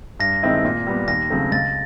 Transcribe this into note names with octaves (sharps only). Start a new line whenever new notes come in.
G2 A#6
D#3 G#3 C4 E4
A#2
G3 B3
D#2 A#6
C#3 F#3 A3 C4
C#2 A6